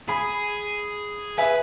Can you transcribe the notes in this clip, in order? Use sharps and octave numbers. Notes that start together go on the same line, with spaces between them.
G#4 G#5 B5
B4 E5 G#5